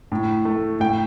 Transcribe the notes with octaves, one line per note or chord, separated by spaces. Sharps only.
A2
A3
A2 G5